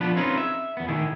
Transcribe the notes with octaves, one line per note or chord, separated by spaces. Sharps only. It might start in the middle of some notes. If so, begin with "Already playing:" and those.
F3 B3 D4 B4
C4 C#4 D#4 F4 G#4 B4
E5
E2 B3
A2 D#3 E4 G#4